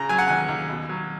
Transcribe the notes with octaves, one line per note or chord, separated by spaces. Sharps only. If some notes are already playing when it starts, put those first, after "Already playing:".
Already playing: C#3 A#5
F#3 G#5
F#5
D#2 G#5
D#2
B2
F#3